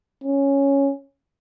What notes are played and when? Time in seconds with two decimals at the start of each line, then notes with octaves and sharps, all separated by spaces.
0.24 C#4